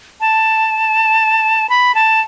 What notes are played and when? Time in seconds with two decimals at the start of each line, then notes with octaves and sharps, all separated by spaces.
0.21 A5
1.70 B5
1.95 A5